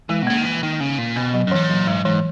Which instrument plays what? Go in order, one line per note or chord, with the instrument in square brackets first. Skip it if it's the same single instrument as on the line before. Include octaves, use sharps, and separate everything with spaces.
[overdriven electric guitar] E3 [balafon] G#3
[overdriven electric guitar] B2
[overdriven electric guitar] C#3 [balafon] A#3
[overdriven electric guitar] D#3
E3
D#3
C#3
A#2
[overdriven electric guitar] B2 [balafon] B3
[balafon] F#3
[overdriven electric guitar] F#2
[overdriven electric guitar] G#2 [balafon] E3
[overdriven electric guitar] A#2
[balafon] F#3
[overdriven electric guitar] G#2 [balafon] G#3
[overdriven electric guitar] G#2 [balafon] E3